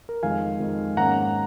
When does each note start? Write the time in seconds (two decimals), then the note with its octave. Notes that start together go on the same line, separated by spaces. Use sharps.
0.09 A#4
0.23 F2 D#3 G#3 F5 G#5
0.60 F2 D#3 G#3
0.97 G#2 D#3 A#3 C#4 F#5 A#5